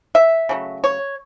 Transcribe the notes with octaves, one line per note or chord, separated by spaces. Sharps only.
E5
C#3 F#3 A3
C#5